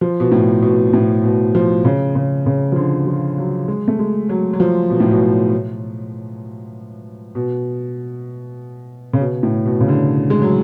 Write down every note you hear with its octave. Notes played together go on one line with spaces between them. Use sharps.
F3
B2
A2
B2
A2
B2
F3
C#3
C#3
C#3
F3
D3
F3
F#3
G#3
A3
G#3
F#3
F#3
F3
B2
A2
B2
B2
C#3
B2
A2
B2
C#3
D3
G#3
F#3